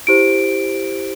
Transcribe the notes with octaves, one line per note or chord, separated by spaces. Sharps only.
E4 G4 C5 D7